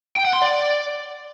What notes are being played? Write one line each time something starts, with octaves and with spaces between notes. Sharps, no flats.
G5
F#5
C6
D5